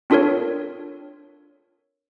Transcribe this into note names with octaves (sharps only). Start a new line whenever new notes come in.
C4 D4 F4 A4 A#4 C#5